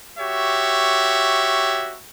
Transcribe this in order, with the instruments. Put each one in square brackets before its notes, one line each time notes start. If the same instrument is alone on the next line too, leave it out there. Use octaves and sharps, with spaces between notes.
[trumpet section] F#4 G4 C#5 E5